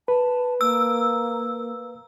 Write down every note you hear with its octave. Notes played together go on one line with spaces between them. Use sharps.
B4 A5
A#3 E6